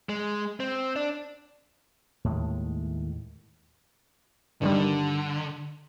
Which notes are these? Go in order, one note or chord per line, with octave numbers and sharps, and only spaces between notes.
G#3
C4
D4
D#2 A2 G#3
G2 D3 D#3 G3